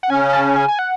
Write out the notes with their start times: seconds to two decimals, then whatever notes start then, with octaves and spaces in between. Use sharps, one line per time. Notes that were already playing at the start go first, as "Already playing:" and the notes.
0.03 F#5
0.10 C#3 C#4 G#5
0.33 A5
0.56 G#5
0.68 G#5
0.79 F#5